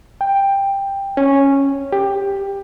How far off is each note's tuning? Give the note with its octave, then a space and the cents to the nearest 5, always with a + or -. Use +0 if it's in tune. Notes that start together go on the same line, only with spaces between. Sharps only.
G5 +10
C#4 -5
G4 +15